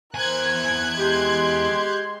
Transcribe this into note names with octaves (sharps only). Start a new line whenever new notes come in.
E2 A#4 C5 G#5 F#6 G#6
G#3 G4 C6